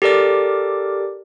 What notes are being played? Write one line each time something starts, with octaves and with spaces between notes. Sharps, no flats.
G4 A4 A#4 D5 D6